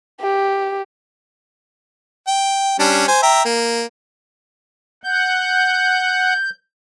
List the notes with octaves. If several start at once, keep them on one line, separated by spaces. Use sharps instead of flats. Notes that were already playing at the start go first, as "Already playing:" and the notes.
G4
G5
G3 C#4 D4
C5 G#5
E5 G5 A#5
A#3
F#5 G6